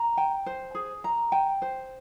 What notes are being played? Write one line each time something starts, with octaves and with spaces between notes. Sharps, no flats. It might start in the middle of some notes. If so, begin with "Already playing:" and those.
Already playing: A#5
G5
C5
G#4
A#5
G5
C5